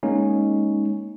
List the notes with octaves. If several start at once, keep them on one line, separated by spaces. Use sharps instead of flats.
G#3 A#3 C#4 D#4